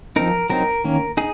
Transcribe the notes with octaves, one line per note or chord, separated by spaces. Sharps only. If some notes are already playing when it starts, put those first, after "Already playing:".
F3 C4 D#4 A#4
F#3 C4 D#4 A#4
D#3 A#3 C#4
D#4 G#4